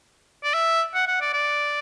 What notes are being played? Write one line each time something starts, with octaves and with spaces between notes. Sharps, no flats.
D5
E5
F#5
F#5
D5
D5